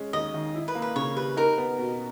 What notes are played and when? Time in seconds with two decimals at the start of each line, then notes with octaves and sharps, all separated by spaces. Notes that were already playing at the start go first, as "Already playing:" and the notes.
Already playing: G#3 C#4
0.13 D#2 D#5
0.34 D#3
0.54 E4
0.68 B4
0.75 A#3
0.82 B4
0.96 C#3 C#5
1.16 G3 B4
1.37 D#4 A#4
1.58 B3
1.78 B2